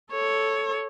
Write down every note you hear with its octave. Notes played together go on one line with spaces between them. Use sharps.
A4 C#5